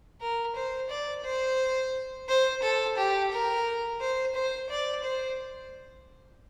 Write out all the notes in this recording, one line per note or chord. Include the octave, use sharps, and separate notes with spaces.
A#4
C5
D5
C5
C5
A4
G4
A#4
C5
C5
D5
C5